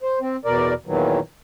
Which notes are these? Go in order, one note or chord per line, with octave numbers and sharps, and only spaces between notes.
C5
C4
E2 B2 A#4 D5
E2 A#2 D#3 E3 F#3